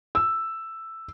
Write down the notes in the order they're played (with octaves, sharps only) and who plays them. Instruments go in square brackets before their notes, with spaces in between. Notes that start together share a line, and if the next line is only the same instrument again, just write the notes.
[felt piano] E6